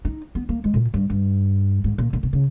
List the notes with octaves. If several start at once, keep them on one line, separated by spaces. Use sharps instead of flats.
D#4
B3
A#3
G#3
A#2
G2
G2
G#2
A#2
A#2
B2
C#3